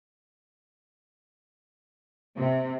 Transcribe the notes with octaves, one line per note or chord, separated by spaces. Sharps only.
C3